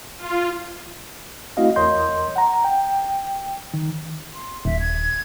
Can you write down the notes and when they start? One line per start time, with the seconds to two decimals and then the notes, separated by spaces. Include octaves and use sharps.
0.16 F4
1.57 A3 C4 E4 F#4 D#5 F5
1.76 E2 A#4 C#5 D#5 C6 G6
2.36 F#5 A#5
2.64 G5
3.74 D#3
4.33 C6
4.65 D#1 E5
4.80 G#6